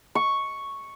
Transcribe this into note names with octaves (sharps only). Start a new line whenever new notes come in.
C#6